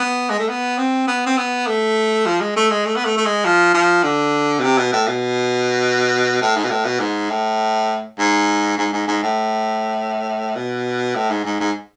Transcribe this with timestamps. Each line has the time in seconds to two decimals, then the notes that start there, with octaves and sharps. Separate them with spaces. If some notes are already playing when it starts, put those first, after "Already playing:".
Already playing: B3
0.30 G#3
0.39 A3
0.49 B3
0.78 C4
1.07 B3
1.26 C4
1.37 B3
1.67 A3
2.26 F3
2.41 G#3
2.56 A3
2.70 G#3
2.86 A3
2.96 B3
3.05 A3
3.17 A3
3.25 G#3
3.45 F3
3.74 F3
4.03 D3
4.59 B2
4.63 C3
4.78 B2
4.93 A2
5.08 B2
6.41 A2
6.56 G#2
6.64 B2
6.71 A2
6.85 B2
7.00 G#2
7.30 A2
8.19 G#2
8.78 G#2
8.92 G#2
9.08 G#2
9.22 A2
10.55 B2
11.15 A2
11.30 G#2
11.45 G#2
11.60 G#2